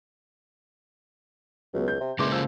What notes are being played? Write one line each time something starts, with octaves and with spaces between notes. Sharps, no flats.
C#2 F#3 B3
G6
C3
E2 C#3 G#3 A#3 E5 C6 D6
F3 E6